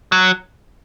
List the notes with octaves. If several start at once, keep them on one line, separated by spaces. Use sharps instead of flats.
F#3